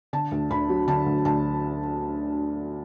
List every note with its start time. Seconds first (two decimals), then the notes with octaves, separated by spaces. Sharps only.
0.13 D3 A5
0.32 D2
0.51 D2 B5
0.69 F#3
0.87 D3 A5
1.06 D2
1.25 D2 A5